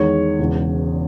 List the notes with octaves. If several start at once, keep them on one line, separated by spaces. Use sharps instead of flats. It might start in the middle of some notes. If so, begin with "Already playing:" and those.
Already playing: E2 D#3 G#3 C#5
E1 E2 C#3